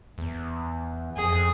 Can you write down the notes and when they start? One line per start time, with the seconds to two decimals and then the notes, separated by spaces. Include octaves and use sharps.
0.18 E2
1.17 F2 G#4